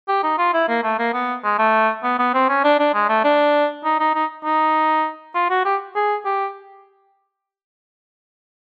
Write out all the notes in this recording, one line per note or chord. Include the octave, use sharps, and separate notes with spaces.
G4
D#4
F4
E4
A#3
A3
A#3
B3
G#3
A3
B3
B3
C4
C#4
D4
D4
G#3
A3
D4
D#4
D#4
D#4
D#4
F4
F#4
G4
G#4
G4